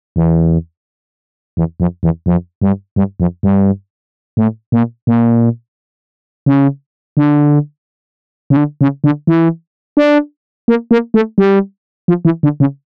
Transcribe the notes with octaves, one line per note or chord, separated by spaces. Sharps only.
E2
E2
F2
E2
F2
G2
G2
F2
G2
A2
A#2
A#2
C#3
D3
C#3
D3
C#3
D3
E3
D4
A#3
A#3
A3
G3
F3
E3
D3
C#3